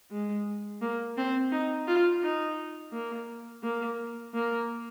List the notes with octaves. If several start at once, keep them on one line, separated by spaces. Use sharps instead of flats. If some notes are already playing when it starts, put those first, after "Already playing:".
G#3
A#3
C4
D#4
F4
D#4
A#3
A#3
A#3